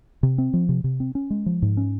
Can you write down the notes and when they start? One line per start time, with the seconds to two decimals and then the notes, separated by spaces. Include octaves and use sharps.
0.23 C3
0.38 C4
0.53 F3
0.69 C3
0.84 C3
1.00 C4
1.15 C#4
1.30 G#3
1.46 F3
1.62 G#2
1.77 C#4